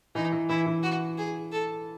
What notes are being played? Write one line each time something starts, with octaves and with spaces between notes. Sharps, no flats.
E3 D#4
E3
E3 E4
E3
F#4
G#4
A4